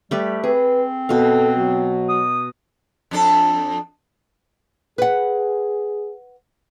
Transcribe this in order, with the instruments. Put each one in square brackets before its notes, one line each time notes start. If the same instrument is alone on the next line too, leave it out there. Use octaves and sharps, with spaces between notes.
[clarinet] G3 [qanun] A3 G4 B4
[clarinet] C4 [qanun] G#4 [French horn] B4
[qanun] B2 F5 [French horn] A4
[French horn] F#3
[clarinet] D#6
[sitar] F2 D4 A4
[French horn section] G#4 [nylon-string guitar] B4 F#5